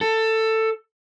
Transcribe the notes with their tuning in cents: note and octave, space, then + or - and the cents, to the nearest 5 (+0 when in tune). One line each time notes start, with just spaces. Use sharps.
A4 +15